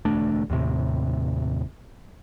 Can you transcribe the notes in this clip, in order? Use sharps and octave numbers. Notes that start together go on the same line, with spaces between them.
E1 D2 A3 D4
D#2 A2 C3